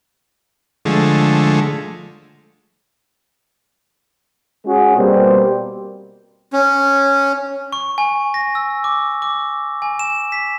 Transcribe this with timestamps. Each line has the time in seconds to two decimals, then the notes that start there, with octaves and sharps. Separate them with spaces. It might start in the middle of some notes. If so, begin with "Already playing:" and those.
0.85 D3 F3 G#3 A3
4.66 G#3 C#4 F#4 G#4
4.97 B2 G3 A#3 C4
6.53 C#4
7.73 C#6
7.98 G#5
8.34 A#6
8.55 E6
8.84 D6
9.22 D6
9.82 G#5
9.99 E7
10.32 B6